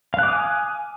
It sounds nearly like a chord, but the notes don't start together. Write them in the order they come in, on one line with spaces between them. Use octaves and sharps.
F5 F#6 D6 D#6 G#5